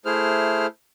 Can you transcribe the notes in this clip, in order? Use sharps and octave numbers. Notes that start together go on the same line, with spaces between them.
A3 E4 G#4 C5 F6